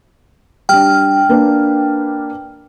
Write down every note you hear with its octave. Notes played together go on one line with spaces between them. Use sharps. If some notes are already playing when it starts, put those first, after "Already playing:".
G3 D4 G5 F6
A#3 D4 B4